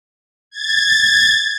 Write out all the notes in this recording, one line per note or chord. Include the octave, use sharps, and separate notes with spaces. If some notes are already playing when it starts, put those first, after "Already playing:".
G#6 A6